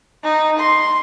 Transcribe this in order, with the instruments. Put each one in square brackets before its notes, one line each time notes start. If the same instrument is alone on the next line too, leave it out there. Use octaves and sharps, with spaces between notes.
[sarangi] D#4
C6